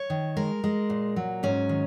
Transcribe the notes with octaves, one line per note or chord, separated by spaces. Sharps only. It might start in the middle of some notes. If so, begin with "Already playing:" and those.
Already playing: C#5
D#3
G#3 A#4
G#3
A#2
F#3
G#2 C#4
D#3